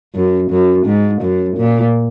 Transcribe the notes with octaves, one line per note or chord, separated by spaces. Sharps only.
F#2
F#2
G#2
F#2
A#2